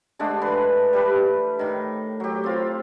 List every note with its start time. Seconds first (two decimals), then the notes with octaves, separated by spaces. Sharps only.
0.19 D3 G#3 A3 D4
0.41 E3 B4
0.93 G3 G4 B4
1.59 A2 D#3
2.20 F#3 G4
2.44 C4 F4